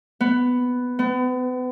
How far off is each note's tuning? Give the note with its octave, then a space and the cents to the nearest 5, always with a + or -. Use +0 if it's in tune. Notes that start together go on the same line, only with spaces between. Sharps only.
B3 +5
B3 +35